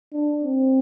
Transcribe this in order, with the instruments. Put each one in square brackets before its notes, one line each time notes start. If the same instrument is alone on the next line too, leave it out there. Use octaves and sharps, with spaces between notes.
[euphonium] D4
C4